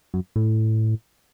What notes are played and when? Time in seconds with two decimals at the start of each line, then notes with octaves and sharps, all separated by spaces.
0.14 F#2
0.36 A2